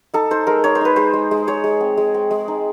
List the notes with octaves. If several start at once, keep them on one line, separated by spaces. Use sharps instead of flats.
D#4 A4
D#4 C5
G#3 A#4
D#4 C#5
C5
D#4 B4
G#3 C5
G#3
G#3
G#3 C#5
G#3
C4
G#3
C4
G#3
D#4